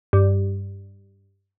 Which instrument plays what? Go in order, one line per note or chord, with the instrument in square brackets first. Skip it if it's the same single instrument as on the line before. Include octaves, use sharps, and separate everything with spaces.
[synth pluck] G2